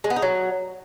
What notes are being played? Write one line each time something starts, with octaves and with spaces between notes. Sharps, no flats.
G#3
B3
D#4
F#3